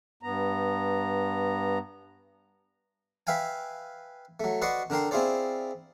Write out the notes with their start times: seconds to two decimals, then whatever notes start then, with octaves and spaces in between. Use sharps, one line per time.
0.23 G2 B3 A#5
3.27 B4 E5 F5 G5 G#5
4.40 F#3 A3
4.62 F#4 B4 D5 D#5 C6 C#6
4.90 D3 D4 A#4 G5 C6
5.11 C4 E4 F4 G#4 C5 D5